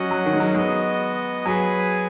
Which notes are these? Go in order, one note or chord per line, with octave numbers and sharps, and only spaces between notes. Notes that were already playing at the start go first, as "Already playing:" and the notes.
Already playing: F#3 C#4 F#4 D#5 F#5
F#3
D#3
G#3
F#3
G#3 B3 F#4 D#5
F#3 G#4 B4 G#5